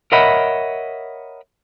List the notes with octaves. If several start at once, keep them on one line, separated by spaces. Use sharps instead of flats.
A#4 C#5 D#5 E5 F#5 B5